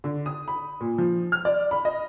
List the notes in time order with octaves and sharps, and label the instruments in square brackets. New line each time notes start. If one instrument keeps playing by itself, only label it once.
[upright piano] D3
D#6
B5
A#2
F3
F6
D5
B5
D#5